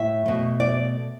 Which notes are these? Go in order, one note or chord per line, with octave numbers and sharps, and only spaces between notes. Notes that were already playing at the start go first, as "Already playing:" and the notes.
Already playing: A2 E5
B2 A3
D5